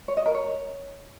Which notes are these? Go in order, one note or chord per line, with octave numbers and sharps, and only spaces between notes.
C#5
D#5
A#4
C#5